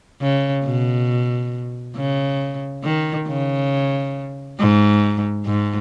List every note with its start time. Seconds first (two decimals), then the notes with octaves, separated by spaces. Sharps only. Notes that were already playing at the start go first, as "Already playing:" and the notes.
0.21 C#3
0.64 B2
1.96 C#3
2.84 D#3
3.27 C#3
4.59 G#2
5.46 G#2